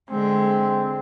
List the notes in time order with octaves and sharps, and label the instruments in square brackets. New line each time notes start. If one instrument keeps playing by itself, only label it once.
[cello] D3 G#3 [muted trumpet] C4